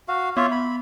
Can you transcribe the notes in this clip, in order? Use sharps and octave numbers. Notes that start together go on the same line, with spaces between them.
F#4 F5
B3 F4 C#5 E5
B5